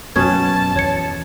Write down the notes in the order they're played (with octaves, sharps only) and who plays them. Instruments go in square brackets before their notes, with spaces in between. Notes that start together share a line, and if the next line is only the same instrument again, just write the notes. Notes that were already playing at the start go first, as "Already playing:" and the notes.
[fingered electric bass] F#2 [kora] B2 C#4 [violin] A5 [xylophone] G#6
[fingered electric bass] E2 [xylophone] C#5 G#6 C#7